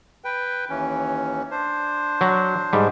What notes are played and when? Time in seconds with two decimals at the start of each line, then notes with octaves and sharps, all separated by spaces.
0.24 B4 G5
0.70 D#2 E3 C#4
1.51 D4 C5
2.21 F#3
2.73 G#2 G3